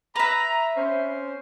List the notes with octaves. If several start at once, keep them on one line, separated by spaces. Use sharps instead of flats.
B4 E5 A#5
C4 C#4 C5